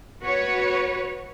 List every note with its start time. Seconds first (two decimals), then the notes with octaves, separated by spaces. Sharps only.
0.23 F#4 B4 C#5